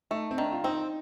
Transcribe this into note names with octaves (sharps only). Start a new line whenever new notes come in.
A3 D#4
C4
D#3 D4
F4
C4 D#4